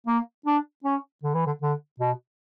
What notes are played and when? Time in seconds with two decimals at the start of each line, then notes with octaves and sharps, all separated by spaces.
0.06 A#3
0.46 D4
0.84 C#4
1.23 D3
1.34 E3
1.46 D3
1.62 D3
2.00 B2